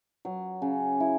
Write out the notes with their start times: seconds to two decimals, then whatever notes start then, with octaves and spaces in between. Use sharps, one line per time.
0.25 F#3
0.62 C#3
1.00 E4